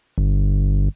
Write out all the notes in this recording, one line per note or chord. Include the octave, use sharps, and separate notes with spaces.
G1